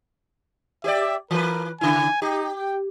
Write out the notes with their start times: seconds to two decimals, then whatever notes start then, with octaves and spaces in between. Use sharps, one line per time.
0.84 G4 C5 D5 E5
1.31 E3 A#4 B4
1.81 C#3 E4 G#5
2.22 D#4 G4
2.57 G5